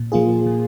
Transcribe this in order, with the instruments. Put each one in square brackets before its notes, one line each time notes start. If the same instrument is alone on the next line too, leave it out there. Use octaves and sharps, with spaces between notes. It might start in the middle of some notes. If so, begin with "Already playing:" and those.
Already playing: [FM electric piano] A#2
F3 A#3 F4 G#4
A#2